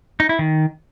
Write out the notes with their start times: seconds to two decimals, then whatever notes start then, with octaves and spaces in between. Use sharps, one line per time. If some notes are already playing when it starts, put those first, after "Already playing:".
0.20 D#4
0.29 E4
0.39 D#3